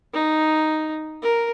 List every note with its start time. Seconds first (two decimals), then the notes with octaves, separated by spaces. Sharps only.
0.14 D#4
1.23 A#4